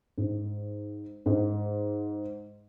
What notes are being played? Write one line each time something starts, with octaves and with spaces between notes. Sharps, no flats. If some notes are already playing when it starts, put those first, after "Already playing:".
G#2
G#2